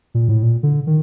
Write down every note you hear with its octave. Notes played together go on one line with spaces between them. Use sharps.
A#2
A2
A#2
D3
D#3